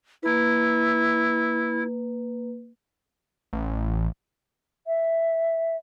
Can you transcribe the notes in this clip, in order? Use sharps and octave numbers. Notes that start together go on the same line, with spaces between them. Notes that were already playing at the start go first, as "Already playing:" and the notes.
A#3 E4 B4
A1
E5